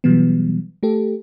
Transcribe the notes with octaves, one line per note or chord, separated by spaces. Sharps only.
B2 E3 F#3 G3 B3
A3 G4 A4